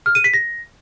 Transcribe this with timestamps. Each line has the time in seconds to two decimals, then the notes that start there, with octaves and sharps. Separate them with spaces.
0.06 F6
0.15 D#7
0.24 B6
0.34 A#6